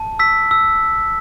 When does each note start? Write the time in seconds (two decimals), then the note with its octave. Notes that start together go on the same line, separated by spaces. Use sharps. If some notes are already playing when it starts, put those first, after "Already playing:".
Already playing: A5
0.19 E6 B6
0.51 E6